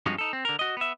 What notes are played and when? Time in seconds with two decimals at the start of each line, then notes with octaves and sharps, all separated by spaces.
0.06 G2 F3 F#3 G#3 C4 C#4
0.18 D#4 A4
0.33 C4
0.45 D3 A#4
0.59 F#4 D#5
0.77 B3 E5